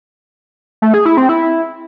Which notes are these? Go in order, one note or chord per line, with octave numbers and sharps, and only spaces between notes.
A3
G#4
E4
C4
E4